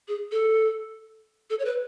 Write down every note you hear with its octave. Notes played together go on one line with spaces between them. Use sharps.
G#4
A4
A4
C#5
B4